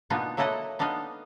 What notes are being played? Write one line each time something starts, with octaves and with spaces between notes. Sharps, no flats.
B2 A#3 B3 D4 D#4 F4
F#3 A#3 E4 A4 D#5 F#5
B3 D4 D#4 D#5 F5